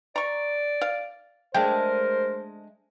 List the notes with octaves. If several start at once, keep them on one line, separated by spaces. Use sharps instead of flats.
D5 A#5 C#6
F5
G#3 A3 D4 A#4 C5 G5